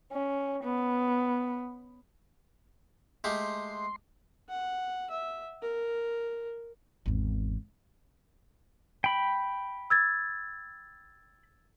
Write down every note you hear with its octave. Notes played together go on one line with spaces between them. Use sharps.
C#4
B3
G#3 A3 G4 C6
F#5
E5
A#4
G#1 E2
G5 B5
E6 G#6 A6